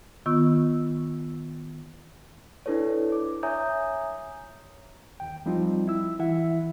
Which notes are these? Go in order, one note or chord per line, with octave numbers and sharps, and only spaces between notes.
D#3 B3 F4 C#6 E6
D4 E4 A4 B4 C#5
D6
C#5 E5 G#5 A#5 D#6 G6
D#2 G5
F3 G3 C4 D#4 F4
E4 E6
E3 E4 E5 F#5